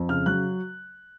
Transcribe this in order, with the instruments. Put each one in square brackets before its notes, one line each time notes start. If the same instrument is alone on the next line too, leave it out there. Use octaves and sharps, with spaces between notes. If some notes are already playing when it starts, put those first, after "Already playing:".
Already playing: [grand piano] F2
C#3 F6
F#3 F#6